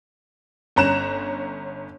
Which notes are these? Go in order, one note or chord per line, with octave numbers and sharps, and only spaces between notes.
G1 C#4 A#5 F#6 E7